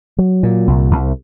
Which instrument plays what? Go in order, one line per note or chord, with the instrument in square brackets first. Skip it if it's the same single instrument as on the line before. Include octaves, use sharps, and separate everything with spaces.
[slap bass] F#3
A#2
C2
C2